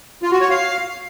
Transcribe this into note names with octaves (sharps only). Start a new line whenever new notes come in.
F4
F#4
C#5
F5